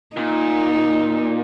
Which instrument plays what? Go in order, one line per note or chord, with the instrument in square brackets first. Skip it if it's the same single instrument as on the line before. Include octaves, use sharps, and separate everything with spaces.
[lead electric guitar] A#2 [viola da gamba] D#4